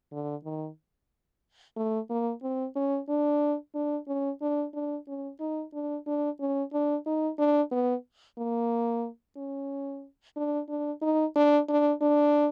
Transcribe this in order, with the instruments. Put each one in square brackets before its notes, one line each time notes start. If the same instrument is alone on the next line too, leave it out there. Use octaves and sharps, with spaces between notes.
[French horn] D3
D#3
A3
A#3
C4
C#4
D4
D4
C#4
D4
D4
C#4
D#4
D4
D4
C#4
D4
D#4
D4
B3
A#3
C#4
D4
D4
D#4
D4
D4
D4